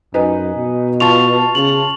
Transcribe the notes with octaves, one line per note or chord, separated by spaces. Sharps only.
F#2 D#4 B4 G#5
B2
F4 A5 C#6 F7
C#3 F#7